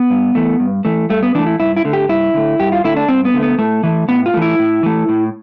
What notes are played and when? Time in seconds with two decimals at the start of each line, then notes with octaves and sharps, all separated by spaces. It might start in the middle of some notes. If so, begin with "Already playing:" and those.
Already playing: B3
0.10 G2
0.35 E3 A3
0.60 G2
0.85 E3 A3
1.10 G2 A3
1.23 B3
1.35 E3 D4
1.39 A3
1.47 E4
1.59 G2 E4
1.77 E4
1.85 D3 A3
1.93 G4
2.09 G2 E4
2.34 D3 A3
2.60 G2 G4
2.72 F4
2.84 D3 A3 E4
2.97 D4
3.09 G2 C4
3.25 B3
3.34 D3 A3
3.43 B3
3.59 A2 A3
3.83 E3 A3
4.09 A2 B3
4.26 F4
4.34 E3 A3
4.42 E4
4.59 A2
4.83 E3 A3
5.09 A2